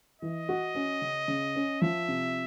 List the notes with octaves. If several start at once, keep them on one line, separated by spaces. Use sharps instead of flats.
E3 D#5
F#4
C#4
C#3
C#3
C#4
F3 E5
C3